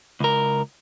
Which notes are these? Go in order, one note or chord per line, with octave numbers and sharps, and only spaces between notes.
C#2 A#4